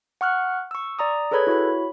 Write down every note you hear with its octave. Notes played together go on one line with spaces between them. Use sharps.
F#5 C#6 F6 F#6
C#6 E6
D5 A#5 D#6
G#4 A4 B4 C#5 B5 G#6
E4 F#4 C#5 B5